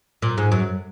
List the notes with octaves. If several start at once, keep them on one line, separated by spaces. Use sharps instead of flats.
A#2
G#2
F#2